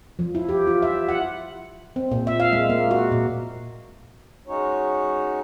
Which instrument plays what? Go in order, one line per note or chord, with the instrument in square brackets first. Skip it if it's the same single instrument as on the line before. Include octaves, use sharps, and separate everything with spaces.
[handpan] F3
E4
G4
F4
E5
F#5
C4
A#2
E5
F5
G#3
A#3
F#4
A#2
[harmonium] G#3 C#4 D#4 F#4 C#5